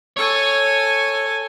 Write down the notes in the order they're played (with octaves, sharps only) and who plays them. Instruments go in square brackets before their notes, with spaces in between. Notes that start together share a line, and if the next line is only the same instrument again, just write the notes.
[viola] A4 G#5 [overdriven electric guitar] C#5